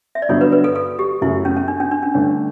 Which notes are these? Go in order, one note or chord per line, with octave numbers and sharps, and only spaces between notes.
E5
D5
G2 D3 F#3 B3 A4 C#5
B4
B4
A4
A4
G4
F#2 C#3 F#3 A3 E4
C#4
C#4
D4
C#4
D4
C#4
G2 D3 A3 C#4 D4